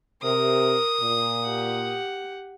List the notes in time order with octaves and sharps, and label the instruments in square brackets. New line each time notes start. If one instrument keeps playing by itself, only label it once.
[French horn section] C3 [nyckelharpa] A#4 [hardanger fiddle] D#6
[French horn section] A#2
[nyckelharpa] G4 F#5